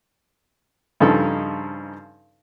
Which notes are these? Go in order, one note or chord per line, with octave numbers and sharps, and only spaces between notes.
G2 C#3 F3 D#4 A4